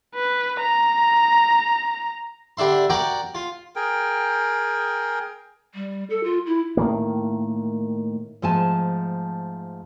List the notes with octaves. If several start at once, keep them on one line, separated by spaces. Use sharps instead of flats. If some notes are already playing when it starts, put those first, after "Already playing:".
B4
A#5
D3 G3 D4 E5 C6
F#4 A#4 D5 F#5 G5
F4
G#4 A#4 G5
G3
A4
F4
E4
A2 D#3 A#3
G#2 F3 A3 G#5 A5